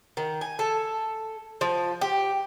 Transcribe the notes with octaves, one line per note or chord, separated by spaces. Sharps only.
D#3
G#5
A4
F3
G4